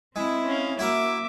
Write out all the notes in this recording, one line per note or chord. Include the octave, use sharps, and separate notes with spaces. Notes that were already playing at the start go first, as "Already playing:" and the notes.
G#3 C4 E4 E5
C#4 F5
A#3 E4 F#4 A#4 E5 D6